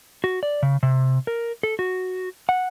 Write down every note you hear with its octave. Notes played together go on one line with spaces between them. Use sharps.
F#4
D5
C#3
C3
A#4
A4
F#4
F#5